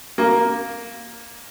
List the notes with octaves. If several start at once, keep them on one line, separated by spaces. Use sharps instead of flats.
A#3